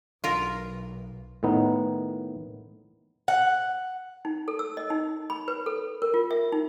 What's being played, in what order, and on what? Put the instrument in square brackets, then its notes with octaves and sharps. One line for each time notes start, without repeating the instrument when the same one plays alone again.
[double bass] B1 [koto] F4 A#4
[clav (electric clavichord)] A2 D#3 B3 D#4
[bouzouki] F#5
[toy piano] D#4
A4
E6
D#5
D#4
B5
B4
A4
A#4
F4
E5
D#4